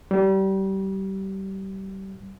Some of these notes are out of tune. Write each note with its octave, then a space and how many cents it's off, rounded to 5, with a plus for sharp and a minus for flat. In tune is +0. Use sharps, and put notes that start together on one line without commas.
G3 -30